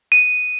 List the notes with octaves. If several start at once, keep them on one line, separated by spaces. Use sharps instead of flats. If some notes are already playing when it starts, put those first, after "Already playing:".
D#7